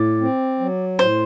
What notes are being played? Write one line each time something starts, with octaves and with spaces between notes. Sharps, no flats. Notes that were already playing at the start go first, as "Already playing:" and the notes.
Already playing: A2 D5
C4
F#3
A2 C5